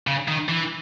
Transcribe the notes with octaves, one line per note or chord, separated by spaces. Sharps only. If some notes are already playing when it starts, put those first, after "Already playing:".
C#3
D#3
E3